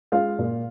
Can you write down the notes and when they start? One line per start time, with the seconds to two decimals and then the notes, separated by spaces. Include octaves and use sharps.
0.12 G#3 F4 F5
0.39 A#2